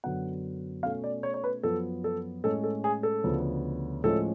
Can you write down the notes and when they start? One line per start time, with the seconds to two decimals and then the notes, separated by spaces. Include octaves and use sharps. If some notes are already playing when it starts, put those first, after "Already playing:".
0.04 F#2 D3 F#3 B3 F#5
0.83 B2 A3 C#4 F5
1.04 D5
1.23 C#5
1.34 C#5
1.44 B4
1.63 F#2 F3 B3 A4
2.04 A4
2.44 A2 G#3 C#4 A4
2.64 A4
2.84 G#4
3.03 A4
3.24 D2 C#3 F3 B3
4.04 A2 F3 G#3 C#4 A4